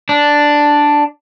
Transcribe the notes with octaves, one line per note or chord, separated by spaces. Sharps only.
D4